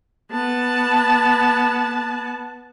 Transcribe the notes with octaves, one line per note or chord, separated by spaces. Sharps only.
B3 A5